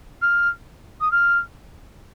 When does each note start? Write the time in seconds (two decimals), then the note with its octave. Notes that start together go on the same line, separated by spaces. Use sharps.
0.22 F6
1.01 D#6
1.12 F6